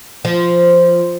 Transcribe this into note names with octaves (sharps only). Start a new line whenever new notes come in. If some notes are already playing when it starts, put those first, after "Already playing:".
F3